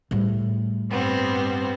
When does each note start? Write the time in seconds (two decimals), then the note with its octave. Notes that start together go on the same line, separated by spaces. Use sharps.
0.11 A2 G3
0.90 G2 B3 C4